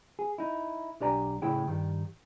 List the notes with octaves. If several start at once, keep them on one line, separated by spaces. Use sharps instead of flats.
G#4
D#4 E4
B1 D4 G4 D5 G#5 A#5
A2 C#3 E4 G#4 G5
G2 D#3